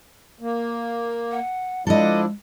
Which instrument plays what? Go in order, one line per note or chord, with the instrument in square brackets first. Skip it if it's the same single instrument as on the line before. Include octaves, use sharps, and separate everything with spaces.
[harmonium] A#3
[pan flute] F#5
[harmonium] F3 D4 E4 [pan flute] G#3 [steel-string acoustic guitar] A4 D#5